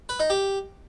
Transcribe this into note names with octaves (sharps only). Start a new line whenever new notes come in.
B4
D#4
G4